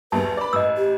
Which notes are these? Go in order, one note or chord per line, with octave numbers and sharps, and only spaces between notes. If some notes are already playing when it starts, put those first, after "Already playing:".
A#1 D#2 F#3 B4 A5
D5 B5
A1 D#5 E6
G4